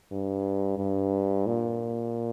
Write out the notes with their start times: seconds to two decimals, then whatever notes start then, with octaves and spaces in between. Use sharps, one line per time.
0.11 G2
0.78 G2
1.46 A#2